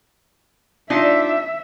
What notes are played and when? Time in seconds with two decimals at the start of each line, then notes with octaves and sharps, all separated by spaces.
0.90 D4 D#4 F4 E5